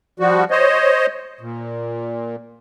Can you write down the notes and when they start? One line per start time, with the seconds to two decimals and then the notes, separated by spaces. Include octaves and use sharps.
0.20 F3 G3 F#4
0.51 C5 C#5 D#5
1.41 A#2